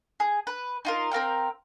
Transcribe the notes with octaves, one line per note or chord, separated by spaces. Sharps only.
G#4
B4
D#4 F4 A#4
C4 A#4 F5 G5